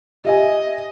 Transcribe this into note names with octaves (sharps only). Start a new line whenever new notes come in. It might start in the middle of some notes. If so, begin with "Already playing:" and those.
G4 D#5 E5 G#5